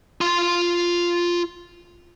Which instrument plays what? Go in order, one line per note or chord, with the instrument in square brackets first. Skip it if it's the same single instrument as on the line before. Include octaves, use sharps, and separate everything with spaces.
[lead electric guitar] F4 C6